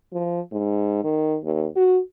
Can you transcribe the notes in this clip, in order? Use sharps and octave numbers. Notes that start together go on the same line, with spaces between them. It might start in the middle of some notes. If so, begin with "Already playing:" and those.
F3
G#2
D#3
D#2
F#4